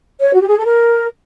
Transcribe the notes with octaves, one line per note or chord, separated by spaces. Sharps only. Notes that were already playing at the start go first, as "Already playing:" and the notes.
C#5
F#4
G4
G#4
A4
A#4